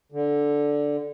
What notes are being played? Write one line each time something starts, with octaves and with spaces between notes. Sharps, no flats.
D3